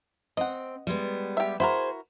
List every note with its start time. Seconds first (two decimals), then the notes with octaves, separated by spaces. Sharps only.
0.37 C4 D#5 F#5
0.87 G3 G#3 B3
1.37 G4 E5
1.60 E4 F#4 G#4 A#4 C5